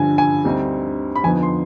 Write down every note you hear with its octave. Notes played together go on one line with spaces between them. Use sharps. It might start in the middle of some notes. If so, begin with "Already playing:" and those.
Already playing: G2 D3 F3 G#5
G#5
D2 D3 G3 C4 D#4
B5
F2 D3 F3 B3 D#4 G#5
C6